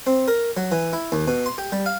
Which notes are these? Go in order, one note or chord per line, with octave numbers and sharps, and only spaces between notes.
C4
A#4
F#3
E3
E4
D#2
B2
C6
G4
G3
F5